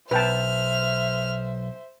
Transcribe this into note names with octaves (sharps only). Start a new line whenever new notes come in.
B1 B4 C5 E5 G5 A5 F6